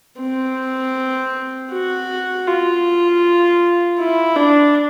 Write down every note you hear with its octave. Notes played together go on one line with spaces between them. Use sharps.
C4
F#4
F4
E4
D4